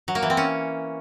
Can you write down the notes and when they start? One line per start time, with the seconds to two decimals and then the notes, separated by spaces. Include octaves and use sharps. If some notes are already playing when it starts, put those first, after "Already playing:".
0.08 F#3
0.15 A#3
0.23 E3
0.30 C4
0.37 C#4